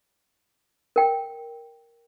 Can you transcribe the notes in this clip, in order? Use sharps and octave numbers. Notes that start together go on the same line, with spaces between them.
A#4 G5